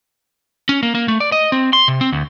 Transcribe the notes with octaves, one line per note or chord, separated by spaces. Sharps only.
C#4
A#3
A#3
A3
D5
D#5
C4
C6
C3
C4
D2